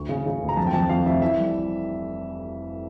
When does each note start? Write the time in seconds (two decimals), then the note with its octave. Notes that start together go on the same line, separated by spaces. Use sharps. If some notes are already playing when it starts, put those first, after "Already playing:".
Already playing: D2 C#6
0.09 C#3
0.26 C#3
0.42 D2
0.49 A#5
0.57 F2 A5
0.67 G5
0.73 F2 A5
0.89 F2 F5
1.06 F1 E5
1.21 E3 E5
1.37 G3